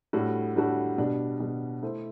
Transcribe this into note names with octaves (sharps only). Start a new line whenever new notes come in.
A2 G3 D4 F#4 A4
A2 G3 D4 F#4 A4
B2 G3 D4
B2 G3 D4
A3 E4 A4 C5